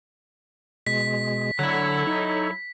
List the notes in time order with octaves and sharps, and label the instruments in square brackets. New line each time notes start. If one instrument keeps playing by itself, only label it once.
[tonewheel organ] B2 G#3 [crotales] B6
[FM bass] D3 [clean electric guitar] F#3 E4 [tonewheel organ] A4 C#5
[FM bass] D#4